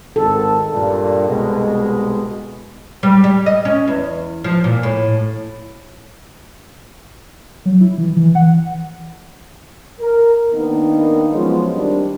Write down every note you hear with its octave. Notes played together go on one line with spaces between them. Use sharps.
G#1 D#3 A4
G2 A#2
C2 B2 G#3
G3
G3
D#5
C#4
E2
F3
A#2
A2
F#3
E4
E3
E3
F#5
A#4
D#3 A#3 B3 D4 D#4
F3 F#3 G#3 B3 C#4 F4
D#3 G3 C4 D4